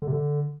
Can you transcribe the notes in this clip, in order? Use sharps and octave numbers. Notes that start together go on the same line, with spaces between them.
D3
C3
D3